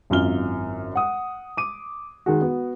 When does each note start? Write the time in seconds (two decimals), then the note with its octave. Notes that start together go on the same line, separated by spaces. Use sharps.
0.10 G#1 F#2 E4 F4 F6 G7
0.96 F#5 D#6
1.57 D6 D#7
2.26 D#3 G#3 F#4
2.42 B3 F#4